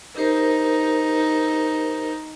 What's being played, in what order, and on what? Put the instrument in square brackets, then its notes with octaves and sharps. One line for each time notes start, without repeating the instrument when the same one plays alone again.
[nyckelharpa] D#4 [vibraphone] G4 A#4 C5